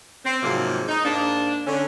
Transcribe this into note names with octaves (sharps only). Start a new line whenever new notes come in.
C4
G#2 C3 F3 F#3 A#3
D#4
G#2 A#3 D4
D3 C#4